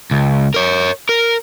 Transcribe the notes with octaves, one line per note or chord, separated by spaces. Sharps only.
C#2
A#4 C#5
A#4